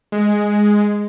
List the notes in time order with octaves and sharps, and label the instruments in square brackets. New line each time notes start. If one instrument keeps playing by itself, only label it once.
[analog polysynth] G#3